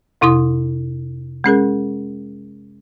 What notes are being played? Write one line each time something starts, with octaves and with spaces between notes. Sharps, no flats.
F2 C3 E4 C6 D#6
G#3 C#4 G#4 A#4